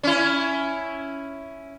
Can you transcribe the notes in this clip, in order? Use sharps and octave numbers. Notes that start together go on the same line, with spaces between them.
C#4 E4